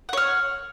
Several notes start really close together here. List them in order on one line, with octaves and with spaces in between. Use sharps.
F#5 C#5 F6